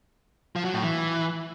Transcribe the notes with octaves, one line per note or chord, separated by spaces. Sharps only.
F3
F#3
A2
E3